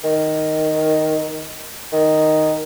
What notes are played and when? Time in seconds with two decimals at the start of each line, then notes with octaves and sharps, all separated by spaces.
0.04 D#3
1.93 D#3